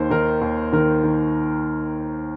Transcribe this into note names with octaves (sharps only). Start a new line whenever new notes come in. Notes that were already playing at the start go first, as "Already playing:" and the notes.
Already playing: D#2 D#3 C5
D#3 A#4
D#2
D#3 A#4
D#3